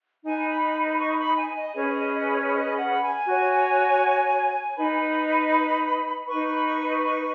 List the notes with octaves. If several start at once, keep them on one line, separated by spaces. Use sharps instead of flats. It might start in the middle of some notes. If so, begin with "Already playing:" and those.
D#4 B4 G#5
B5
B5
C#6
B5
G#5
D#5
C#4 G#4 B4 C#5
D#5
D#5
C#5
C#5
D#5
F#5
B5
G#5
F#4 C#5
D#4 B4 B5
D#4 B4 C#6
B5
C#6
C#6